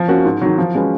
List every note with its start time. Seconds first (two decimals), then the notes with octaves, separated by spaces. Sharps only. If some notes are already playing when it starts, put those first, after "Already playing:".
Already playing: F3
0.08 A#3 C#4 F#4
0.25 G#2
0.41 D#3 F#3
0.58 F3
0.75 G#3 C#4 F#4 B4